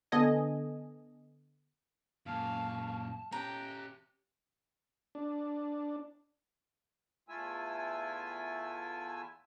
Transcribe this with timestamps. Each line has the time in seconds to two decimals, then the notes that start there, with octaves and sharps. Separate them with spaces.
0.12 D3 B3 A4 D#5 G#5
2.26 F#2 A#2 F5 A5 C#6
3.32 C#4 G4 G5 A#5 F#6
5.15 D4
7.29 E2 A3 E4 F4 G#5 E6